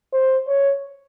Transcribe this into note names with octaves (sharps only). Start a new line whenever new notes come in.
C5
C#5